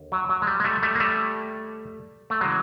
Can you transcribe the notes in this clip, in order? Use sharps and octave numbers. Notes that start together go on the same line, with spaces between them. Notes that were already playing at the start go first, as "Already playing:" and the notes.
Already playing: D#2 D3
F#3
F#3
G#3
G3
G#3
G3 A3
G3 A3
A#3
G3 A3
A3
C#3 E3 F#3 G#3